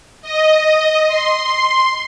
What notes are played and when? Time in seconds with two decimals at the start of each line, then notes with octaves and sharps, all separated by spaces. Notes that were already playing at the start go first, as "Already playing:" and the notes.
0.22 D#5
1.08 C6